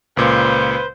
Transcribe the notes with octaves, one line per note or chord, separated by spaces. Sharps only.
C#2 A#2 B4 C5